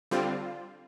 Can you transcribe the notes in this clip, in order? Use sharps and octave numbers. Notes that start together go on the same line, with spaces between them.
D3 G3 C4 F4